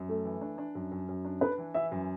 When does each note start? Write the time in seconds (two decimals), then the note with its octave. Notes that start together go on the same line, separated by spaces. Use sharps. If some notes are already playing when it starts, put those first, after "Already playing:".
Already playing: F#2
0.08 A3 A4
0.25 E3
0.41 D4
0.58 D4
0.75 F#2
0.91 F#2
1.08 F#2
1.25 D4
1.41 D4 B4
1.58 E3
1.74 E3 E5
1.92 F#2